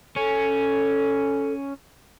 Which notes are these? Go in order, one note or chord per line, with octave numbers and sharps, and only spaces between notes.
C#4 A4